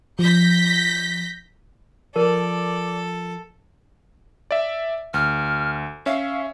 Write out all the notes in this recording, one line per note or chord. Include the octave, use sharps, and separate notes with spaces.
F3 G6 A#6 B6
F3 A4 A#4 D5
D5 E5
D2 F6
C#4 E5 F5